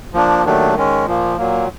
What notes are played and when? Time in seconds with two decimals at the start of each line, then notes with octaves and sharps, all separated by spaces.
0.14 F3 A#3 D4
0.44 D#2 D#3 F#3 A3 D4
0.75 D#3 G#3 C#4
1.06 A#2 F3 A#3
1.37 A#2 F#3 A#3